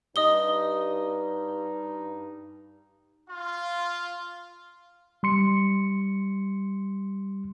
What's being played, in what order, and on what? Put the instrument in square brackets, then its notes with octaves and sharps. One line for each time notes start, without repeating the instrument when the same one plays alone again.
[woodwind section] G2 D#4 [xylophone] D#5 D#6 G7
[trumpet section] F4
[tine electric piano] G3 C6 C#7